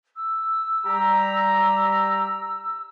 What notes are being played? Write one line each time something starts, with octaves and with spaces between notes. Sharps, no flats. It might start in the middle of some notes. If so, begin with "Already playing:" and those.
E6
G3 G4 A#5